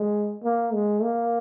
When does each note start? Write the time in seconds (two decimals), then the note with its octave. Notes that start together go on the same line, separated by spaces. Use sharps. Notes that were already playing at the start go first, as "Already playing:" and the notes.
Already playing: G#3
0.43 A#3
0.73 G#3
1.03 A#3